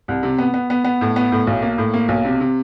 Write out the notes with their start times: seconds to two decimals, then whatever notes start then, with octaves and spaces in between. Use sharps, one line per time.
0.08 C2
0.23 C3
0.38 B3
0.54 B3
0.70 B3
0.84 B3
1.01 A2
1.16 B3
1.32 A2
1.47 B1
1.62 A#3
1.78 A2
1.94 A#3
2.08 B1
2.24 C3
2.40 C3